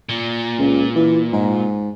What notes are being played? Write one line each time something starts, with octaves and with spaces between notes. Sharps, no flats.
A#2
C#2
E3
G#2